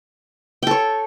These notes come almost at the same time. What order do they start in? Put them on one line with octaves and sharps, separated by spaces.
G5 A4 C#5